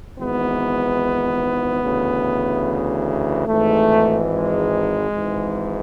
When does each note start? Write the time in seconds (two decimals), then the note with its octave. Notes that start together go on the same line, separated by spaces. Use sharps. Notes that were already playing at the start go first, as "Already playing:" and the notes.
0.18 G#1 G#2 E3 B3
1.82 D2 C#3 E3
3.47 G#1 G#2 E3 A3
4.29 G#3
5.10 G#1 G#2 E3